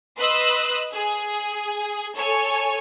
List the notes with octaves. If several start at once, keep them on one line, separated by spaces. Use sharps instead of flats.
B4 D#5 C6 D#6 E6 F#6
G#4
A4 C#5 G#5